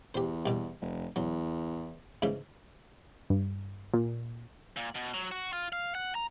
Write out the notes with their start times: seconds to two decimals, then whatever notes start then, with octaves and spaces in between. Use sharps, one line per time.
0.14 E2 G4 C5
0.46 C2 B2
0.82 F1
1.16 E2 F#3
2.22 G#2 C#3 E3
3.30 G2
3.94 A#2
4.77 A#2
4.95 B2
5.14 F#3
5.31 F#4
5.53 F4
5.73 F5
5.95 F#5
6.15 A#5